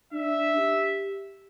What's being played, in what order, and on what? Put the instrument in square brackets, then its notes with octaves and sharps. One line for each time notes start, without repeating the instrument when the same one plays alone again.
[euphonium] D4 [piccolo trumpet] E5
[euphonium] G4